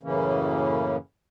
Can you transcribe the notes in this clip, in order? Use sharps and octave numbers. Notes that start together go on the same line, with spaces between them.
F#2 A2 C#3 E3 A#3 C#4